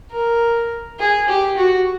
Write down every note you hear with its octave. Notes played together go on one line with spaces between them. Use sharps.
A#4
G#4
G4
F#4